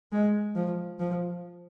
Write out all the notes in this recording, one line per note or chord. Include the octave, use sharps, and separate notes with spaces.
G#3
F3
F3